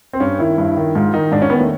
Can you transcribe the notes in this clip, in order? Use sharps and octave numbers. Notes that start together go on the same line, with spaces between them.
C4
G2 C#4
D#3 E4
G2
D#3
G#2 F4
D#3 D#4
G#2 D4
C#4
D#3 B3
A3